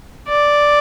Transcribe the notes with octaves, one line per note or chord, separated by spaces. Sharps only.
D5